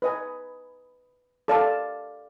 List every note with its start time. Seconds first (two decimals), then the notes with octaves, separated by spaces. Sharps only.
0.02 B4 D#5 G#5
1.48 A4 D5 F5 A5